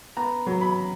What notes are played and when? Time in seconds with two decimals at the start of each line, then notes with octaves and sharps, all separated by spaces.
0.17 B3 A#5
0.46 F#3
0.61 B5